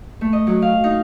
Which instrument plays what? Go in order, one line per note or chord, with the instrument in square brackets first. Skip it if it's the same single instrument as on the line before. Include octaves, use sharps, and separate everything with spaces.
[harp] A3
D#5
F#3
F5
D#4